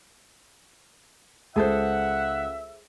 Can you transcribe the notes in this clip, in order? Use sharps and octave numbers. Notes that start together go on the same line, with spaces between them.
C#2 G#4 A4 C5 E5 F#5